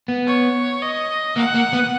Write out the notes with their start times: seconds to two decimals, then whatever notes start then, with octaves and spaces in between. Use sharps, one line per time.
0.08 B3
0.27 C#5
0.82 D#5
1.37 A#3 F#5
1.55 A#3
1.73 B3